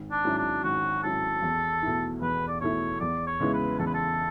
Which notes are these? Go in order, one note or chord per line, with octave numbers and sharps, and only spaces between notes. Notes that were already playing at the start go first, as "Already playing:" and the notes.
Already playing: G#1
D4
G#2 F#3 C#4 E4
D4
G#1 F#4
G#2 F#3 C#4 E4 A4
E2
B2 A3 E4
E2 B4
D5
B2 A3 E4 C#5
E2 D5
C#5
C#3 G#3 B3 E4
B4
E2 A4
B4
A4